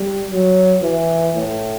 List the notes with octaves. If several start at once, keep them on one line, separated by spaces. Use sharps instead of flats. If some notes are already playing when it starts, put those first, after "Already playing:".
Already playing: G3
F#3
E3
A2